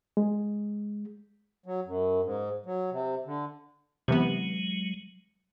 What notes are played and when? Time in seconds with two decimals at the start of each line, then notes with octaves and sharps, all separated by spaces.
0.17 G#3
1.66 F#3
1.85 F#2
2.24 G#2
2.66 F#3
2.91 C3
3.25 D3
4.08 C3 E3 F#3 G#3 B3